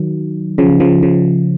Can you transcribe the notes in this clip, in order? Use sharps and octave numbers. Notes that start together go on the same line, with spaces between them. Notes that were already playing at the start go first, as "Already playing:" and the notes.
Already playing: D#3 F#3
C#3 F3
C#3 F3
C#3 F3